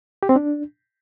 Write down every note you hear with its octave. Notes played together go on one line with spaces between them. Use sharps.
G4
C4
D4